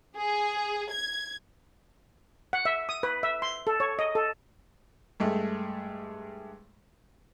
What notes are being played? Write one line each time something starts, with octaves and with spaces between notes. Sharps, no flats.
G#4
G#6
F#5
E5
D#6
B4
E5
C6
A4
C#5
D#5
A4
G2 G#3 A3